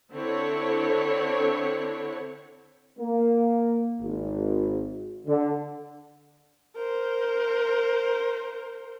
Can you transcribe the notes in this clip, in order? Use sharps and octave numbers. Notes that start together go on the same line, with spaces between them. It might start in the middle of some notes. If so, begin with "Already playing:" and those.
D3 C4 E4 C#5
A#3
G#1
D3
A#4 C5